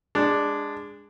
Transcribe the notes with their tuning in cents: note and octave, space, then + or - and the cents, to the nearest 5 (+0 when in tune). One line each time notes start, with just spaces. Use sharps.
G#3 -15 D4 +0